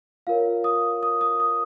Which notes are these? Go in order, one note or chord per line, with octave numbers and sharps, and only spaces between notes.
F4 A#4 C#5 F5
D#6
D#6
D#6
D#6